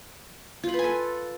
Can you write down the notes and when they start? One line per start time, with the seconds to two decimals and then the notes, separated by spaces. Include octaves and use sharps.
0.63 F4
0.69 B5
0.74 B4
0.79 G#5
0.84 A4